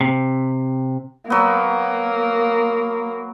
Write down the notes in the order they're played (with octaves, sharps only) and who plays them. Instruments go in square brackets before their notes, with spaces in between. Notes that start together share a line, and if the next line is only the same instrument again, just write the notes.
[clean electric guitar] C3
[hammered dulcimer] F#3 B3 [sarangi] A#3